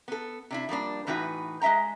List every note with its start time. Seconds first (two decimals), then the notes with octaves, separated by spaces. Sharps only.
0.08 B3 A4
0.50 C3 D4 E4
0.69 F3 G3 A#3 D4
1.07 A2 E3 D#4 F#4 B4
1.62 G#3 D#5 E5 G5 A#5